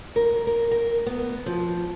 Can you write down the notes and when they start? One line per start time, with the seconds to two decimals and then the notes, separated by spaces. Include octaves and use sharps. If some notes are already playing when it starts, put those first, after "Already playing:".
0.16 A#4
0.47 A#4
0.71 A#4
1.06 B3
1.46 F3